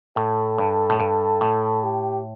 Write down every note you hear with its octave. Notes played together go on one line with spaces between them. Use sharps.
A2 A4
G2
A2
G2 A4
A2
G4